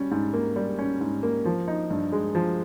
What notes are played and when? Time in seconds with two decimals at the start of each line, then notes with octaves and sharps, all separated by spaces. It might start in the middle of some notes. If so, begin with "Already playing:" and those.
Already playing: G3 C#4
0.11 G#2
0.33 A#3
0.56 G3
0.79 C#4
1.01 G#2
1.23 A#3
1.45 F3
1.68 D#4
1.91 G2
2.12 G#3
2.35 F3